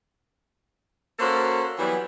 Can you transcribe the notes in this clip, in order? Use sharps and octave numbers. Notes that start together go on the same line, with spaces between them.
A#3 C#4 F#4 A4 C5
E3 F#3 G3 B3